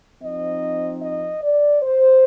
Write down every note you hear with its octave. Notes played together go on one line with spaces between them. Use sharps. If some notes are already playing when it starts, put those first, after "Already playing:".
F3 C4 D#4 D#5
D#5
D5
C5